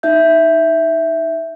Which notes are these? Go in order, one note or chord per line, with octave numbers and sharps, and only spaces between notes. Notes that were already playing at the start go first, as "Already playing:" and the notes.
D#4 E5 G6